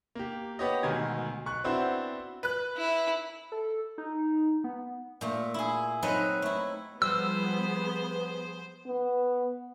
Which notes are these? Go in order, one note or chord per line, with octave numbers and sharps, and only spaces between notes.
A#3 G4
B3 G4 C#5 D#5
D2 G#2 B2 D#3 G#5 G#6
B1 C#6 F#6
B3 C4 D4 E4 F#4 C5
B4 F#6
E4
A4
D#4
B3
A#2 A3
E4 G#4
F#3 C4 D#4 A4 B4 D#5
A3 E4
F3 G3 B3 G#4 C5 E6
B3